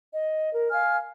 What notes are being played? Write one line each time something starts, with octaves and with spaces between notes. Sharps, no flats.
D#5
A#4
F5 G#5 F6